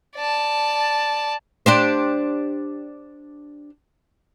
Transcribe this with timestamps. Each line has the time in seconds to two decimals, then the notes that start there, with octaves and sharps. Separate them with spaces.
0.16 D5 A5
1.66 D4 G4 C5